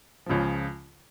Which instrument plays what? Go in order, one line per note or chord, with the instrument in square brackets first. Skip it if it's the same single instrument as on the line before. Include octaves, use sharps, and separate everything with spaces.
[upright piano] C#2 C#3 F3